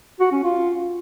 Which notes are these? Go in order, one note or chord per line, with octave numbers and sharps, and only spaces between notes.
F#4
C#4
F4